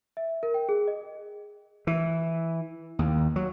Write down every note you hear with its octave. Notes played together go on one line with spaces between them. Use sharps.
E5
A#4
G5
G#4
D#5
E3
D#2
F#3